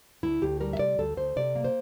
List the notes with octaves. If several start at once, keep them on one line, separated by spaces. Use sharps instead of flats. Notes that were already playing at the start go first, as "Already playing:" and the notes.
D2 E4
D2 G4
G3 A#4
E5
C3 D5
D2 A4
D2 C5
C3 D5
A#3
C5